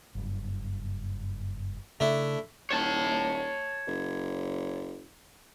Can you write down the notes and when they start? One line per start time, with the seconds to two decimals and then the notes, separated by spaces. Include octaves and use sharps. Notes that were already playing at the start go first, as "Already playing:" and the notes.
0.15 F#1 G2
2.00 C#3 A3 D4 E4
2.70 D#1 C#5 A5
3.87 F#1